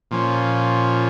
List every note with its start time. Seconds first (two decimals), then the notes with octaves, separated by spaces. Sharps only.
0.11 A#2 F3 C#4